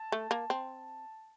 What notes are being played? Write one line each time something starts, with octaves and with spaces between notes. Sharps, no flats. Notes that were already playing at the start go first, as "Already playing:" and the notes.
Already playing: A5
A3
A#3
C4